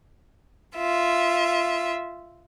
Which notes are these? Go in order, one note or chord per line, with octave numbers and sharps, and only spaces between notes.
F4 E5